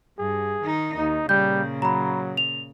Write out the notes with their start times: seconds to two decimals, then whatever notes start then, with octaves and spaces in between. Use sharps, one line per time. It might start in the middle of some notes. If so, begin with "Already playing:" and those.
0.18 G2 G#4
0.64 D#3 D#4
0.97 D#2 D#4
1.29 A#2 C#3 G3 G6
1.82 F#3 A#5 B5
2.37 F7